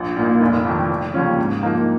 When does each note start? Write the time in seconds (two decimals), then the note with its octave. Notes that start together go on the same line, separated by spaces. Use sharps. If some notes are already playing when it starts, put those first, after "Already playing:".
Already playing: A#1
0.17 A#2 A#3 D#4
0.41 F1
0.66 F2 D#3
0.89 F1
1.14 D#2 C#3 F3 C#4
1.39 G#2
1.63 F3 A#3 D#4